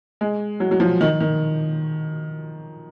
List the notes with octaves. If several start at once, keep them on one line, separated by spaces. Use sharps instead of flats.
G#3
F#3
F#3
F3
D#3
D#3